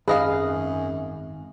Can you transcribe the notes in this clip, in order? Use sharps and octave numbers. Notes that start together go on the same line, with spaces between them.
G#1 F#2 G#4 B4 D#5 F5